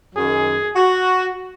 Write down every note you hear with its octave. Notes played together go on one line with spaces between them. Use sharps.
F#2 D#3 F#3 G#4
F#4